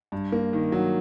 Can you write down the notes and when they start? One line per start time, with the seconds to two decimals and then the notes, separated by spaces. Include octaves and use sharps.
0.12 G2
0.32 A#3
0.53 D#3
0.72 F#3